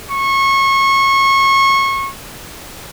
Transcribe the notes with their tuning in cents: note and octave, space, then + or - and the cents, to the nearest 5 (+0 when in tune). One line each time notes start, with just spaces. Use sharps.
C#6 -25